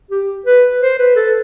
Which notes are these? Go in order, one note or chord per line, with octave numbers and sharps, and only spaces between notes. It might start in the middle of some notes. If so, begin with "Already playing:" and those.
G4
B4
C5
B4
A4